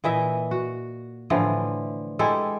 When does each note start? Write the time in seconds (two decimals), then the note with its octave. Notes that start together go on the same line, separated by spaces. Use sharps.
0.04 A#2 E3 D#5 E5
0.51 F#4
1.30 A2 D3 E3 F3
2.19 G#3 E4 G4 A4